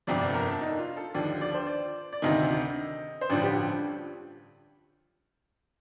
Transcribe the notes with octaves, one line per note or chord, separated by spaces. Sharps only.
G1 F2 C3 F3 D5
D5
A4
A#4
D4
D#4
F4
A4
D#2 D3 F3 D5
D5
C5
D5
D5
D2 C3 D#3 D#5
C5
A1 G2 D3 F3 D5
G4